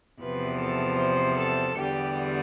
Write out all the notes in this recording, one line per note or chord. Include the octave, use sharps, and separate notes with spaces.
E2 C3 F3 B4
A4
C5
A4
E2 D3 G3 G4